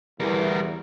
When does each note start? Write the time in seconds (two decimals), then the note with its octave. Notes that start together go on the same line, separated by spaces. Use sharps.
0.20 E2 G3 A#4